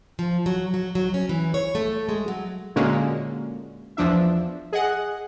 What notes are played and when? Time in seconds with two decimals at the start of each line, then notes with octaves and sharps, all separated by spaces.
0.19 F3
0.46 F#3
0.74 F#3
0.95 F#3
1.14 C#4
1.29 E3
1.54 C#5
1.75 A3
2.09 G#3
2.28 F#3
2.76 A#2 D3 G#3 A#3 C#4 F#4
3.97 E2 F3 D4 E5
4.72 G#4 D#5 F#5